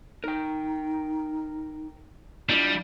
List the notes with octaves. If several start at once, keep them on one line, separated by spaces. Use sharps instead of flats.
D#4 A#4 G5
G3 D4 E4 F4